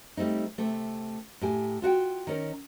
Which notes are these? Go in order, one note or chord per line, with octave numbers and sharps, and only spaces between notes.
G3 A3 C4 D#4
C3 A3
A2 G4 G#5
F4 F#4 F#5 G5
D#3 C#4 A#4